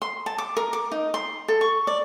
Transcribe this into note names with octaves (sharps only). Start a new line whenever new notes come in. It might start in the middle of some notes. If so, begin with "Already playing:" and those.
C6
A5
D6
A#4
D6
D#4
C6
A4
C#6
D5